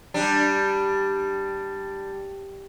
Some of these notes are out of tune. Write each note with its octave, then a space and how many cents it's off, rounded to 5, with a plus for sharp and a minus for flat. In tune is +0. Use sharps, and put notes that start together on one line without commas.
G3 +0 D4 +5